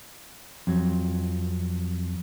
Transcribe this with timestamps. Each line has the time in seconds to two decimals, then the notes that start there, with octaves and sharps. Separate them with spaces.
0.67 F2 F#3